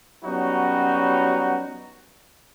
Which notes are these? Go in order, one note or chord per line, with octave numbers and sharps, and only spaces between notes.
F#3 G3 B3 C#4 D#4 F#4